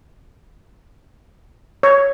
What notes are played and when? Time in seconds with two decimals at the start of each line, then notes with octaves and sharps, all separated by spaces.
1.83 C#5